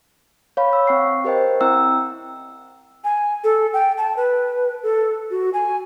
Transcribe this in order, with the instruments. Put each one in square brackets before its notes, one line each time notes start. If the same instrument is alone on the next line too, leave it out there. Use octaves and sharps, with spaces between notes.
[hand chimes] C#5 F5 B5
E6
C4 F5 G5 C#6 C7
G4 A#4 C5 D#5 G5
C4 E4 G5 A#5 E6
[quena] G#5
A4
G5
A5
B4
A4
F#4
G#5